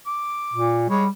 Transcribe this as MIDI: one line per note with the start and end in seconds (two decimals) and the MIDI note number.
0.07 0.82 86
0.54 0.88 46
0.89 1.09 55
0.89 1.05 56
0.89 1.05 73